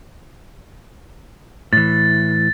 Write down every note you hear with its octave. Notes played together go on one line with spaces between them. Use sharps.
A2 E3 A6